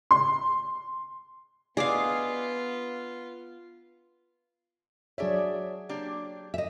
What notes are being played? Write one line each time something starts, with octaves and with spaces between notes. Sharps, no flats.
C6
B3 D4 F4 G#4 D5 D#5 F5
F#3 D4 G#4 C#5 D5 E5
A#3 D4 G4
D#5 E5